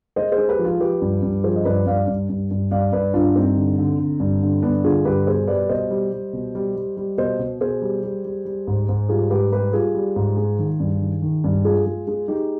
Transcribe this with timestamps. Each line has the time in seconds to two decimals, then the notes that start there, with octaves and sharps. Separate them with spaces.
0.16 G#3 C5 D#5
0.32 G#4 C5
0.38 G#3
0.48 G4 B4
0.59 F3
0.65 F4 G#4
0.80 F3 G4 B4
1.01 G2
1.23 G2
1.44 F3 G#4 C5
1.56 D#5
1.65 G2 B4 D5
1.86 G2 D5 F5
2.07 G2
2.29 G2
2.51 G2
2.71 G2 D5 F5
2.92 G2 B4 D5
3.14 G2 D4 F4
3.35 G2 C4 D#4
3.56 D3
3.78 D3
3.99 D3
4.20 G2
4.42 D3
4.63 G2 B3 D4
4.84 D3 F4 G#4
5.05 G2 G4 B4
5.27 B2 G#4 C5
5.47 G3 B4 D5
5.69 B2 C5 D#5
5.90 G3
6.12 G3
6.33 B2
6.55 G3
6.76 G3
6.97 G3
7.18 B2 C5 D#5
7.39 B2
7.60 B2 G#4 C5
7.82 G3
8.03 G3
8.25 G3
8.45 G3
8.67 G#2
8.89 G#2
9.09 G3 F4 G#4
9.30 G#2 G4 B4
9.52 G3 G4 B4
9.73 G3 F4 G#4
9.95 G3
10.16 G#2
10.37 G#3
10.59 D#3
10.80 G2
11.01 D#3
11.22 D#3
11.44 G2
11.64 G#3 F4 G#4
11.86 G#3
12.07 G#3
12.28 G#3 D#4 G4